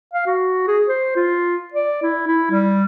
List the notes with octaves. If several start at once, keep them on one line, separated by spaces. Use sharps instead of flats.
F5
F#4
G#4
C5
F4
D5
E4
E4
G3